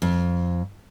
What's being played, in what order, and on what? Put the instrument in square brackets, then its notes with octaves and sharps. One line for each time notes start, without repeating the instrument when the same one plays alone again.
[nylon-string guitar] F2